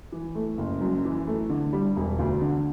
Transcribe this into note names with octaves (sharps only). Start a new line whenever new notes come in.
E3
A3
F#1
F#2
E3
A3
D3
G3
E1
D2
D3